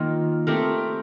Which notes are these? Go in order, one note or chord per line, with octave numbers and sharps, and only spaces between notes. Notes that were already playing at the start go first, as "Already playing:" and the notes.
Already playing: D#3 A#3 F4
A3 C4 G4 A#4